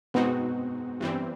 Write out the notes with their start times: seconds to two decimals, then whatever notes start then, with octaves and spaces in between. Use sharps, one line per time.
0.14 B2 G#3 B3 C4 D#4 F#4
1.00 G2 E3 G3 C4